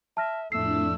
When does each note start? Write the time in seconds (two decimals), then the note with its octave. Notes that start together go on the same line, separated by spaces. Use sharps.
0.17 E5 A5 F6 A#6
0.52 F2 A2 A3 D4 E6 C7